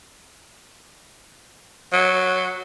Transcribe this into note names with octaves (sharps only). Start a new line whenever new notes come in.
F#3